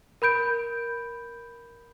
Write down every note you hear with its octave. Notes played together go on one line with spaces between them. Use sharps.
A#4 B5 G6 D7